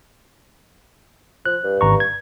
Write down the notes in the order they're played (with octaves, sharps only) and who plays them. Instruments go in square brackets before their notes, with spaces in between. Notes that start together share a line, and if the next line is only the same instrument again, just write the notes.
[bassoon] F3 [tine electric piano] F#6
[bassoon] G2
[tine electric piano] G#1 A#5 C#6
G#6